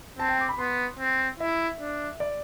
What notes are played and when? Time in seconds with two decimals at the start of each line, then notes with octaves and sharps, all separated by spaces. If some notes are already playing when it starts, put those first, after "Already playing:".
0.19 C4 A5
0.29 G5
0.39 D6
0.49 B5
0.59 B3 C6
0.99 C4
1.40 E4 E5
1.80 D4
2.20 D5